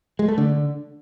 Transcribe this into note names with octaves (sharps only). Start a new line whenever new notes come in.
G#3
A3
D3